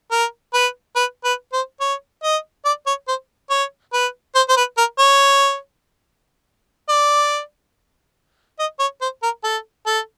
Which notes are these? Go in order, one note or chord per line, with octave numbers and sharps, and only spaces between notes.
A#4
B4
B4
B4
C5
C#5
D#5
D5
C#5
C5
C#5
B4
C5
C5
B4
A#4
C#5
D5
D#5
C#5
C5
A#4
A4
A4